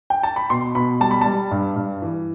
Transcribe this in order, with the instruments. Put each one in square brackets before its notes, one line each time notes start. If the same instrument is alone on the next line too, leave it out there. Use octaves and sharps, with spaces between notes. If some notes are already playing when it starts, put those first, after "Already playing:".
[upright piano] G5
A5
B5
B2 C6
B2 B5
G3 A5
B5
G3 A5
G2
G2
E3